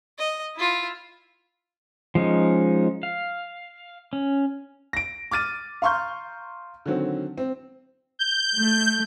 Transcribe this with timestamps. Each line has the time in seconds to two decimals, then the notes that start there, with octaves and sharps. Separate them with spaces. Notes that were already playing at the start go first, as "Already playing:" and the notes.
0.18 D#5
0.56 E4 F4
2.15 F3 G#3 C#4 D#4
3.03 F5
4.13 C#4
4.93 A#6 D7
5.31 D6 F6 A6 D#7
5.82 F5 A#5 C6 C#6 F6 G6
6.86 D3 D#3 F#3 C4
7.38 C4
8.19 G6
8.56 A3